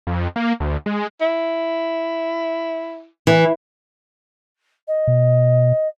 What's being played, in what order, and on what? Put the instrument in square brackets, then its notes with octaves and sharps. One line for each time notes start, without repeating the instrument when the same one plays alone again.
[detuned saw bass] F2
A#3
D2
G#3
[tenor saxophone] E4
[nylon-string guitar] E3
[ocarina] D#5
[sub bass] B2